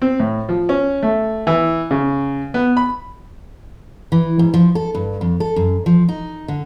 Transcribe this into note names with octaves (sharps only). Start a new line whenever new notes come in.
C4
A2
F3
C#4
A3
E3
C#3
B3
B5
E3
G#2
F3
A4
G2
F2
A4
F#2
F3
D#4
D3